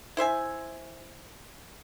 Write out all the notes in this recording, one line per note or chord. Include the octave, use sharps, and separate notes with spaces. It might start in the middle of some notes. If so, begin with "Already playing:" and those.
E4 C5 E5 G#5